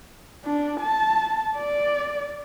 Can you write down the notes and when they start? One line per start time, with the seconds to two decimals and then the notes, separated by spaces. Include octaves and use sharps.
0.45 D4
0.81 A5
1.56 D5